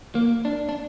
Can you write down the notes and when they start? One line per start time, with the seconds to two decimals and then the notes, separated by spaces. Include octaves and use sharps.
0.15 A#3
0.45 D4
0.69 D4